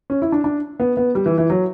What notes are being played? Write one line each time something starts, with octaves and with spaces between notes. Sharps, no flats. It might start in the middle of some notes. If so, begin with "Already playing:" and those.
C#4
E4
D4
D4
B3
B3
G3
E3
E3
F#3